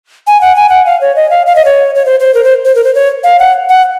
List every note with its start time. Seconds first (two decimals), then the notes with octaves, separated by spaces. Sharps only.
0.27 G#5
0.41 F#5
0.56 G#5
0.69 F#5
0.86 F5
1.01 C#5
1.16 D#5
1.30 F5
1.46 F5
1.55 D#5
1.65 C#5
1.95 C#5
2.06 C5
2.20 C5
2.34 A#4
2.44 C5
2.65 C5
2.75 A#4
2.84 C5
2.95 C#5
3.24 F5
3.39 F#5
3.69 F#5